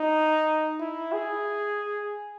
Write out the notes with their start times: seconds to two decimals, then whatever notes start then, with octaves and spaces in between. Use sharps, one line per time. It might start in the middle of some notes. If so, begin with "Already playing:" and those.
Already playing: D#4
0.80 E4
1.13 G#4